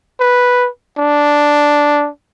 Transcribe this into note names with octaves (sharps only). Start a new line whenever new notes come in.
B4
D4